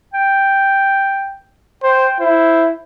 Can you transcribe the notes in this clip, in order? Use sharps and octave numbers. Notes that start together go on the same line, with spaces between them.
G5
C5 G5
E4 C5